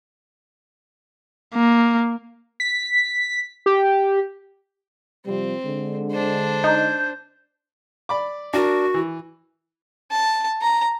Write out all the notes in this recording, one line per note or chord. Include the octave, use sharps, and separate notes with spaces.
A#3
B6
G4
C3 F3 G3 C4
D3 G#3
D4 C5
D#4 G6
D5 B5 D6
D4 F#4 A#4
E3
A5
A#5